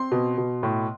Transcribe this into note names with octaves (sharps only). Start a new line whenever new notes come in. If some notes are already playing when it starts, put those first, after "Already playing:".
Already playing: C4 C6
B2
B2
A2